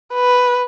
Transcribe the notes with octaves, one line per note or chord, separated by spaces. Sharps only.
B4